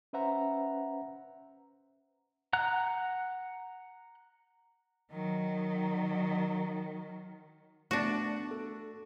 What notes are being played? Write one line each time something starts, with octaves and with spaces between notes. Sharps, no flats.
C#4 B4 C5 E5 F#5 A#5
F#5 A#5 F#6
D#3 F#3
A3 B3 D4 F#4
A4